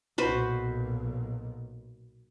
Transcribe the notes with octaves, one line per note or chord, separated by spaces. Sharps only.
B1 A#2 F#4 B4 C5